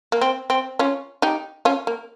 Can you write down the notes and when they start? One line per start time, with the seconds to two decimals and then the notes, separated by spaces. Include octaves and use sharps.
0.12 A#3
0.21 C4
0.50 C4
0.79 C#4 F4
1.22 D#4 G4
1.65 C#4 F4
1.87 A#3